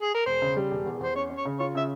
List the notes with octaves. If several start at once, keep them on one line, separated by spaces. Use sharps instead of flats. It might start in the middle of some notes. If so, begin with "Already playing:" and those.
G#4
A#4
E1 C5
C#3
G3
E1
E2
E2 C5
C#4 C#5
C#4
C#5
C#3
F4 C#5
C#3 E5